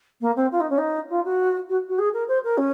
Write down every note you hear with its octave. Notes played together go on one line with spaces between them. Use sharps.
A#3
C4
F4
D#4
C#4
D#4
F4
F#4
F#4
F#4
G#4
A#4
C5
A#4
C#4